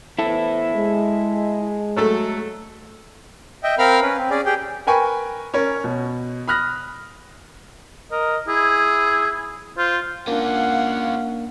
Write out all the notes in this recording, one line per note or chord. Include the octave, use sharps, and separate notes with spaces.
E3 B3 E4 A4 C5
G#3
F#3 A3 A4
D#5 E5 G5
C4 A#4 F5 B5 F6
C#4 B4
C4
C#4 G#4 D5
G4 G#4 G5
A#4 B4 G5 G#5 B5 C#6
C#4 A#4 C#5
B2
B5 D#6 F6 F#6 A#6
A#4 D#5
E4 G#4
F4 C5
A#3 C#4 D4 F4 F5 F#5